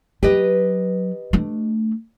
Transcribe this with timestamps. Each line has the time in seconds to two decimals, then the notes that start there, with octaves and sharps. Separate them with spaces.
0.23 F#3 G4 B4 D#5
1.33 A3 D4